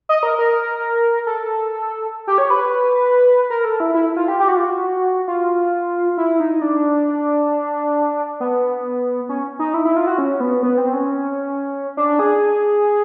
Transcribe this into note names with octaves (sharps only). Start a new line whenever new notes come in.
D#5
A#4
A#4
A4
G4
C#5
B4
A#4
A4
E4
E4
F4
G4
G4
F#4
F4
F#4
F4
E4
D#4
D4
B3
C#4
D#4
E4
E4
F4
F#4
C#4
B3
B3
C4
C#4
D4
G#4